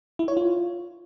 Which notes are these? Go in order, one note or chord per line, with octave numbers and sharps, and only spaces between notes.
E4
C#5
F4